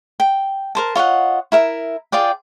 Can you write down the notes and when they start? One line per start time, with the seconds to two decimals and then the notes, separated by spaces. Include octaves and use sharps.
0.20 G5
0.75 A#4 C5 A5
0.95 F4 C#5 D#5 F#5
1.52 E4 A#4 E5
2.12 F4 G#4 D5 G5